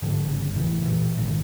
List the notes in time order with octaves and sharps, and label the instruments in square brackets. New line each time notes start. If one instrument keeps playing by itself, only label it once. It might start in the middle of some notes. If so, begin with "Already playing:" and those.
[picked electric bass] G#2 D3 F3
G1 C#3
F1 A2 E3
A#2 E3
A1 G#2 D3 D#3